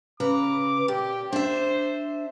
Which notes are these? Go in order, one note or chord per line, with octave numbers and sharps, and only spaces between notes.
C#3 B4 A#5 D6
A#2 G4
D4 C5 E5